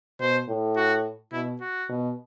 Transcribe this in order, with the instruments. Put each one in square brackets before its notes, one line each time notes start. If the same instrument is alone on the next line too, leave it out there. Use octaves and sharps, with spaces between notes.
[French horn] B2 [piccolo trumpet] C5
[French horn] A2
[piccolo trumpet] F#4
[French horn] B2 [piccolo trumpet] E4
[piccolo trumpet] F#4
[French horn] B2